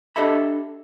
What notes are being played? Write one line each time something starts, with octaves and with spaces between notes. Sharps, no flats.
D4 G4 A4 D#5 E5 B5